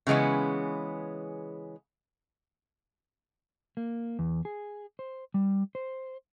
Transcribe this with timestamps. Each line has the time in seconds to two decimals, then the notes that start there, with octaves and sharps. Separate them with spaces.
0.07 C#3 E3 G#3 B3 C#4
3.77 A#3
4.19 E2
4.45 G#4
4.99 C5
5.34 G3
5.75 C5